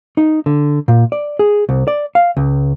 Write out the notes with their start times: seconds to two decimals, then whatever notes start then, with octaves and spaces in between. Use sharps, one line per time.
0.17 D#4
0.46 D3
0.88 A#2
1.12 D5
1.39 G#4
1.69 C2
1.88 D5
2.15 F5
2.37 C#2